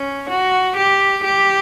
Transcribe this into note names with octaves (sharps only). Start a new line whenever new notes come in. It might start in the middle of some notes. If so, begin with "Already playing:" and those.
Already playing: C#4
F#4
G4
G4